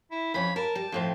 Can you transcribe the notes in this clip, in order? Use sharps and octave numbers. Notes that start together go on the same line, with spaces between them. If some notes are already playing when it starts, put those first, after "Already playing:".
E4
F2 C#4 B5
A#4 A5
G3
F2 A2 C4